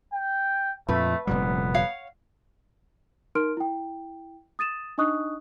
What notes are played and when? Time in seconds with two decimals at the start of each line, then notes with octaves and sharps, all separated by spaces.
0.13 G5
0.89 F2 A#2 A3 B4
1.27 F1 A#2 G3 B3
1.74 C#5 F5 F#5
3.35 D#4 A#4 C6 F6 D7
3.57 E4 G5
4.59 D#6 A6 D#7 E7
4.98 D4 D#4 D#5 C#6 D#6 F#6